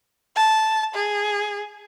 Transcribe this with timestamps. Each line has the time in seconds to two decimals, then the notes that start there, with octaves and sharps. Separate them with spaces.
0.36 A5
0.94 G#4